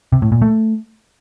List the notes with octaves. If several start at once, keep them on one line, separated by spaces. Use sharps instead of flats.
C3
A2
A#2
A3